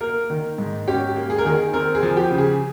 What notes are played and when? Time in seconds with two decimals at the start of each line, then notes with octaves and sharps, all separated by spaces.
0.01 A#3 A#4
0.30 D#3
0.58 G#2
0.88 C#4 G4
1.16 A#3
1.30 G#4
1.38 A#4
1.45 D#3 G#4
1.73 C4 A#4
1.95 G#4
2.03 F3
2.17 G4
2.31 C#3
2.38 G#4